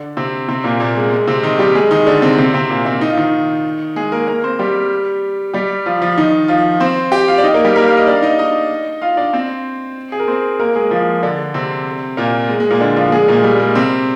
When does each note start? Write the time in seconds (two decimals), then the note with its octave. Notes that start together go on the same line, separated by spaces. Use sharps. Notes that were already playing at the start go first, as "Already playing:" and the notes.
Already playing: D3 D4
0.17 C3 C4
0.48 C3 C4
0.64 A#2 A#3
0.80 A#2 A#3
0.96 G#3
1.12 G#3
1.27 C3 C4
1.43 D#3 D#4
1.59 G3 G4
1.75 G#3 G#4
1.91 D#3 D#4
2.06 D3 D4
2.22 C3 C4
2.38 C3 C4
2.54 C3 C4
2.70 A#2 A#3
2.85 C3 C4
3.01 D#4
3.10 F4
3.17 D#3 D#4
3.96 G#3 G#4
4.12 A#3 A#4
4.28 A#3 A#4
4.44 C4 C5
4.59 G3 G4
5.54 G3 G4
5.86 F3 F4
6.02 F3 F4
6.18 D#3 D#4
6.48 F3 F4
6.80 C4 C5
7.12 G4 G5
7.28 F4 F5
7.38 D5
7.43 D#4 D#5
7.54 A#3 A#4
7.64 G3 G4
7.76 A#3 A#4
7.87 F5
7.97 D#5
8.07 D4 D5
8.16 F5
8.22 D#4 D#5
8.39 D#4 D#5
9.02 F4 F5
9.17 D4 D5
9.33 C4 C5
10.12 G#4
10.19 A#4
10.28 C4 C5
10.60 A#3 A#4
10.76 G#3 G#4
10.91 F3 F4
11.23 D3 D4
11.54 C3 C4
12.17 A#2 A#3
12.49 G#3
12.60 G#3
12.70 A#2 A#3
12.81 D3 D4
12.97 F3 F4
13.12 G#3 G#4
13.22 G#3
13.28 A#2 A#3
13.44 G3
13.59 G#3
13.75 C3 C4